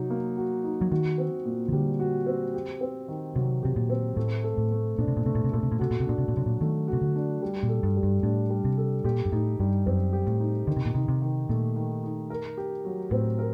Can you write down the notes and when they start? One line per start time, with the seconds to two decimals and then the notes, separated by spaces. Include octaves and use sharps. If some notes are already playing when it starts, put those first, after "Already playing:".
Already playing: C3 F#3 D#4 F#4
0.10 A#3
0.37 F#4
0.64 D#4
0.81 F#3
0.91 D#3 F#4
1.18 C4
1.45 A#2
1.69 D#3
1.72 D3 G3
2.00 F#4
2.27 C4
2.54 G4
2.81 C4
3.08 D#3
3.35 C3 F#3
3.63 C3 G4
3.76 A#2
3.90 C4
4.16 A2 A3
4.44 A4
4.58 A2
4.72 A3
4.98 A#2 D4
5.08 C3
5.17 A#2
5.25 C3 A3
5.35 A#2
5.44 C3
5.52 A#2 A4
5.63 C3
5.72 A#2
5.79 C3 F#4
5.91 A#2
6.00 C3
6.06 A#2 D4
6.18 C3
6.28 A#2
6.34 C3 F#3
6.46 A#2
6.61 D#3 A3
6.88 F#4
6.93 C3
7.01 D3
7.16 D4
7.42 G3
7.63 A#2
7.69 A4
7.83 G2
7.96 G3
8.03 G2
8.23 A2 D4
8.50 G3
8.65 C3
8.77 A4
9.05 A#2 G4
9.25 G2
9.32 A2 D#4
9.60 G2 G3
9.86 F#2 C4
10.13 G4
10.27 A2
10.40 D#4
10.67 D3 D#3
10.77 C3
10.86 A#2
10.94 C3 D#4
11.08 C3
11.22 D#3
11.49 A#2 A3
11.76 D#3
12.04 D#4
12.30 A#4
12.57 G4
12.85 F#3
13.11 A2 C4
13.39 A#4